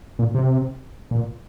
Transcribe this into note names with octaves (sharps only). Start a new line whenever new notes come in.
A#2
C3
A#2